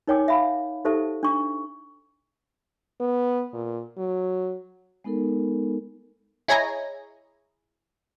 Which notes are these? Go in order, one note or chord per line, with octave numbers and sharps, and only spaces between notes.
D#4 A#4 C#5 G5 G#5 D6
E5 F5 B5
D#4 G4 A4 C5 E5 A5
D4 C#6
B3
A#2
F#3
G#3 B3 D#4 A4 A#4
E4 G#4 C#5 D#5 G#5 A#5